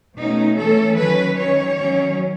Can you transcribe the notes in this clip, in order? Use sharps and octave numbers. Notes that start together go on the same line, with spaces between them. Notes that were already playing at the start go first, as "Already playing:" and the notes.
B2 A3 C#4 D#4
E3 A3 C#4 A4
D#3 F#3 C#4 B4
D#3 F#3 C#4 C#5
D#3 F#3 C#4